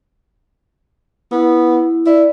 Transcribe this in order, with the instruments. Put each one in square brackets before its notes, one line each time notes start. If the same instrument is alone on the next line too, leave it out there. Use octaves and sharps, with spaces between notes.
[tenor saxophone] B3 [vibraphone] E4
[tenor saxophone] E4 [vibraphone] D5